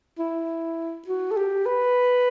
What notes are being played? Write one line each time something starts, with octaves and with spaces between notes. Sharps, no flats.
E4
F#4
A4
G4
B4